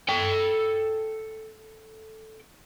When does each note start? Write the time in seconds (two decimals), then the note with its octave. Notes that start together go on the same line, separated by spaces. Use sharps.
0.09 A4 G5